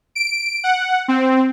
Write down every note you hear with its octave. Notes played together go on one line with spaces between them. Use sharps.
D7
F#5
C4